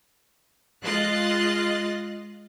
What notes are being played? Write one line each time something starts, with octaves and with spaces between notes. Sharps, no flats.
G#3 F4 D#5 F#6 A6 C7